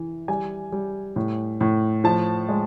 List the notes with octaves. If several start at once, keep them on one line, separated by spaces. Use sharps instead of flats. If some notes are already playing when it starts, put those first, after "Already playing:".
Already playing: E3
G3 G#5
G3
A2
A2
F3 A5
G#3